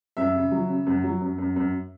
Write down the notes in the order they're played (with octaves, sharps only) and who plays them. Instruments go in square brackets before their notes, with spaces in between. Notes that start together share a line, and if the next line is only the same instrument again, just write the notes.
[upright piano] F#2 E5
C#3
F#3
C#3
F#2
F#3
F#2
F#2
F#2